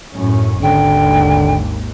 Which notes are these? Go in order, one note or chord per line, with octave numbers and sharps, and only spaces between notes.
F#2 A2 C#4
G#1 D#2 D3 G5